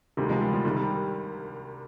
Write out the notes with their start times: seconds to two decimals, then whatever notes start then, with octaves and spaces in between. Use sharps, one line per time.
0.17 D2 C3 D#3 G3
0.29 F3 G#3
0.41 G3
0.53 F3
0.65 C2 C3 D#3 G3
0.76 G3